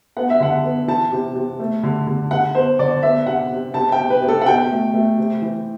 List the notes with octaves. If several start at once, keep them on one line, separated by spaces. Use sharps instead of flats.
B3 F#5
E5
D3 F#5
B3
E3 A5
C3
C3
A3
D3
D3
D3 F#5
B3 C5
D3 D5
B3 E5
C3 F#5
C3
C3 A5
G5
C3
B4
C3
A4
F#5
B2 G5
A3
A3
C3
E3